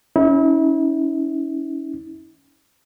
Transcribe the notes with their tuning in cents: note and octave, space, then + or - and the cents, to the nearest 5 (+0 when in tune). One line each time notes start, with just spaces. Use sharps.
C#4 +15 E4 -35